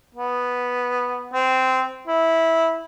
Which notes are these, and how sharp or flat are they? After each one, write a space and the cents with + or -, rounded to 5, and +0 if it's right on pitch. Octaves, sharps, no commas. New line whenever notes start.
B3 -5
C4 -15
E4 -10